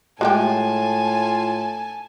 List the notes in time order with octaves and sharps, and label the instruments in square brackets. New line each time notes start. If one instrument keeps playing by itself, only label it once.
[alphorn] A2 [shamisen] G#3 A3 G4 [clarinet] F4 [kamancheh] G#5 A5